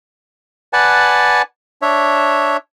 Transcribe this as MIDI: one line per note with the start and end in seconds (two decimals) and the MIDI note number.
0.73 1.42 71
0.73 1.42 74
0.73 1.42 78
0.73 1.42 80
0.73 1.42 81
1.82 2.57 62
1.82 2.57 73
1.82 2.57 76